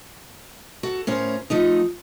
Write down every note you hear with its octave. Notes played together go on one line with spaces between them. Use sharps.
F#4 A4
A2 C#4 A#4 C5
F3 A3 D#4